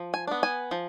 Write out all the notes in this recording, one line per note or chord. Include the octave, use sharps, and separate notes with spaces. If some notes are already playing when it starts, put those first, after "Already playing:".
Already playing: F3
G#5
B3 D4
G#5
F3